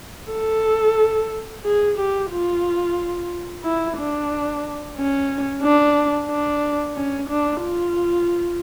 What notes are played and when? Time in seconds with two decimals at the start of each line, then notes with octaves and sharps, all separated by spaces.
0.31 A4
1.65 G#4
1.98 G4
2.31 F4
3.64 E4
3.97 D4
4.96 C#4
5.62 D4
6.29 D4
6.96 C#4
7.29 D4
7.62 F4